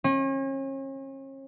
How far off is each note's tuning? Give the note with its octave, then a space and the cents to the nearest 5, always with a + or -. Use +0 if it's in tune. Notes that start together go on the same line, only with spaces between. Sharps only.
C#4 -40